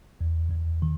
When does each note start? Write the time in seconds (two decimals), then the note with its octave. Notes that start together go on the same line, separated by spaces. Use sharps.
0.21 E2
0.51 E2
0.82 D#3